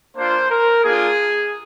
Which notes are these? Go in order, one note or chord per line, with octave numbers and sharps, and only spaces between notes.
A#3 D4 F4 C5
A#4
A#3 D4 F4 G#4